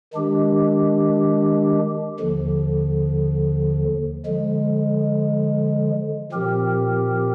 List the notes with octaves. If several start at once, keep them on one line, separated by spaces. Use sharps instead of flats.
D#3 G#3 D4 G4
D#2 D3 F3
D3 F3 G#3
A#2 F3 C4 G4 A#4